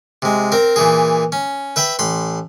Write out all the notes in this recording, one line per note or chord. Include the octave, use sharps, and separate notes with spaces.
C3 G#3
C4 A#4
A#2 E3 G#4
C#4
B4 E5 G5 B5
A1 B5 C6